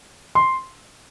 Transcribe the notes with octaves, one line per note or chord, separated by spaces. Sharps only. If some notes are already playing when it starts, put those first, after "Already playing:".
C6